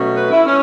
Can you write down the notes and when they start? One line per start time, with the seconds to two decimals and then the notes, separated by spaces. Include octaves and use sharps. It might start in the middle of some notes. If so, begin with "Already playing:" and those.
Already playing: B2 F#3 A3 C#4
0.17 B4
0.31 E4
0.46 C#4